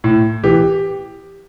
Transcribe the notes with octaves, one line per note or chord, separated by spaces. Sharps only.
A2
E3 G4